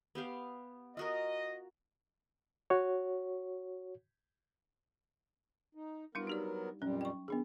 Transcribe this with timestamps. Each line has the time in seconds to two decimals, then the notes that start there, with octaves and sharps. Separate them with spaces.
0.15 B3 G4 F5
0.97 F4 F#4 A#4 D#5
2.70 F#4 C#5
5.75 D#4
6.15 F#3 G3 B3 D4 E4 A#4
6.27 D#4 G4 D5
6.82 F2 A#2 F#3 G3 C#4
7.01 G5 C#6
7.28 D#3 B3 D4 G#4